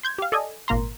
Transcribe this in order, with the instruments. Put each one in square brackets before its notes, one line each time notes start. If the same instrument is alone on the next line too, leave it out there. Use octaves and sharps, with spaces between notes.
[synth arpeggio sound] C6 G6 G#6
G4 F5
A4 D5 D#5 G#5
G#1 A#2 A#3 A#5 C6